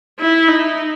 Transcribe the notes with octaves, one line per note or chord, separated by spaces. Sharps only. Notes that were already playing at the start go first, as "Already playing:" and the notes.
E4
D#4